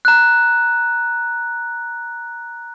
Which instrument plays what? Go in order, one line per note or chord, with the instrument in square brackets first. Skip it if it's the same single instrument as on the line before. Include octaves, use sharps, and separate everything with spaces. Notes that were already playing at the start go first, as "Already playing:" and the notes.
[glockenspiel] A#5 F#6